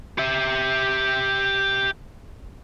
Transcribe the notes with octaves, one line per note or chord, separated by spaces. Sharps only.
G4 E5